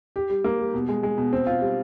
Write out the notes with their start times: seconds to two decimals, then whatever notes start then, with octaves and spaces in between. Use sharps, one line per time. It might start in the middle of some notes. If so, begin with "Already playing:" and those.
0.16 G4
0.30 G3
0.44 A#3
0.59 G3
0.74 B2
0.88 G#3
1.03 G#3
1.18 B2
1.33 C4
1.47 F4
1.61 G3